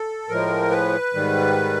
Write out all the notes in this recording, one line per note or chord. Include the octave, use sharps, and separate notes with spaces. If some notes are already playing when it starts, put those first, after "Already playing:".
Already playing: A4
A2 F3 G#3 A#4
B4
G#2 D#3 G3